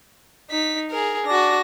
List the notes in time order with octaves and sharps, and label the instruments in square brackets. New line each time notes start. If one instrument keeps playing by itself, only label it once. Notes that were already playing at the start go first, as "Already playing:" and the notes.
[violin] D#4 B6
G#4 A#4
[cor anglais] D4 [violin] F#4 A#6